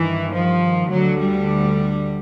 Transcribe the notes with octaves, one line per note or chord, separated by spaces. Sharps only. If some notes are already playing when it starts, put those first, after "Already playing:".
Already playing: G2 D#3 E3
F3
D2 D3 F#3
G3